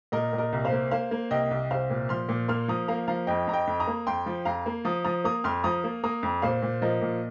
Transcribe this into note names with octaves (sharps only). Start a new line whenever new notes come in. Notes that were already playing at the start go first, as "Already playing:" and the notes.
A#2 A#4 D#5
A#2
A#4 D#5
C2
C5 F5
A#3
A#3 C5 F5
A#3
C2 D#5 G5
C2
C2 C5 F5
A#2
F3 C6 F6
A#2
A#3 C6 F6
F3 A#5 D#6
A#3 F5 A#5
F3 F5 A#5
F2 D#5 G5
F2 A#5
D#5 G5
F2
A#5 D#6
A#3
F2 G5 C6
F3
F2 F5 A#5
A#3
F3 A#5 D#6
F3 A#5 D#6
A#3 A#5 D#6
F2 C6 F6
F3 A#5 D#6
A#3
A#3 A#5 D#6
F2
A#2 C5 F5
A#2
F3 A#4 D#5
A#2